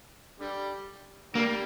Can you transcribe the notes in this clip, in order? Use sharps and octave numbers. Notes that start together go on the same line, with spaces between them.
D3 G3
D3 G3 A#3